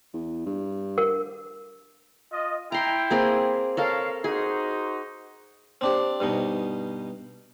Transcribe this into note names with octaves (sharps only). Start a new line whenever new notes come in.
E2
G2
A#4
F4 D#5
E4 G5 A#5 C6
A#3 C4 G#4
A4 A#4 C#5 F5 A5
D#4 F#4 G#4 C5
C4 D4 G4
G2 B2 D#4